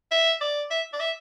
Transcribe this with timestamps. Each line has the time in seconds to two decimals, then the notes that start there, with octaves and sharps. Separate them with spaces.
0.11 E5
0.41 D5
0.71 E5
0.93 D5
1.00 E5